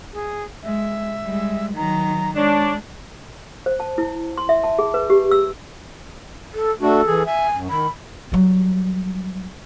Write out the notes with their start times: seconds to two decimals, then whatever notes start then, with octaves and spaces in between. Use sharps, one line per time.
0.13 G#4
0.63 G#3 E5
1.25 G3 G#3
1.75 D#3 F#3 A#5
2.35 G#3 D4 C#5
3.66 C5
3.80 A5
3.98 E4
4.38 C6
4.49 E5
4.64 A5
4.79 G#4
4.94 B4
5.10 G4
5.31 E6
6.54 A4
6.82 A3 D4 F#4 A4
7.07 E3 G#4
7.26 E5 G#5
7.54 F#2
7.70 D#3 B5
8.32 F#3 G3